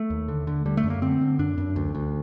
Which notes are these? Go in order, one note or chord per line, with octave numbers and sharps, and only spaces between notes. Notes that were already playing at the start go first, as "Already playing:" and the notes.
Already playing: A3
D#2
D3
D3
D3 G3
A3
F#2
A#3
D3 C4
D3
F#2 D4
F#2
D2
D2